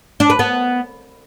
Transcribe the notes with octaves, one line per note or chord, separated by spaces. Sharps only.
D4
B4
B3